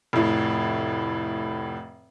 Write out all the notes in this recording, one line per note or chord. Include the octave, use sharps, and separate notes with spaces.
F1 A2